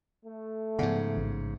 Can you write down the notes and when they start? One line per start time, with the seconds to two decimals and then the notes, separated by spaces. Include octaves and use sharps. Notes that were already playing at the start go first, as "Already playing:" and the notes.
0.24 A3
0.79 G#2 C#3 F3 B3 F#5
1.17 A1